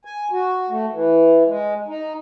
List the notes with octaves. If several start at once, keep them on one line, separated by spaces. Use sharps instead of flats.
G#5
F#4
A3
E3
G#3
D#4